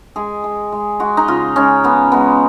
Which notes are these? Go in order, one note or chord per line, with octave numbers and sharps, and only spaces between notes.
G#3 G#4
G#3
G#3
G#3 F#4
D#4
C#3 F4
G#3 C#4
C#3 B3
G#3 B3